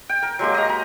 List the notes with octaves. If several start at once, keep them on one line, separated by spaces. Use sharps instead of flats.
G5
A#4
F#3 G#3 A#3 G4
D#5 A#5
A#5